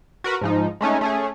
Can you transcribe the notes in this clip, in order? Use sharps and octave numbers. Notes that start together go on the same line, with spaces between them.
F#4 A#4 B4
G#2 F3 D#4
G#3 A3 C#4 D#4
A3 C#4 G#4